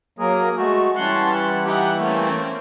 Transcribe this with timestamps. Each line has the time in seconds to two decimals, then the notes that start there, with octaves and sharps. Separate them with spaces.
0.19 F#3 A#3 G#4 A#4
0.57 G#3 A3 F#4
0.97 E3 G3 C#4 F#5 A5 C6
1.34 F#5
1.66 D#4 G4 E5 F#5
1.99 A3 A#3 C4 C#4